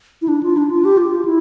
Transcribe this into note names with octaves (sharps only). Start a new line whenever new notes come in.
E4
D4
F4
D4
F4
G4
F4
F4
E4